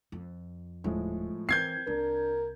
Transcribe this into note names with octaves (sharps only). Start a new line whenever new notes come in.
F2
D#1 A2 F3 G#3
E3 C4 A#4 G6 G#6 C7
C2 D4 A#4